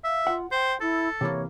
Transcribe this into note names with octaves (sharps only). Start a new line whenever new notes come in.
E5 F5
F4 F#5
C5 G5
E4 A4
C3 E3 A#3 C#5